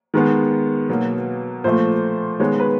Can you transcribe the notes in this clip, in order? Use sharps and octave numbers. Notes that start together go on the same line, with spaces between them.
D#3 G#3 B3
B2 F#3 A#3
A#2 F3 A3 C5
D#3 G#3 B3 C#5
B4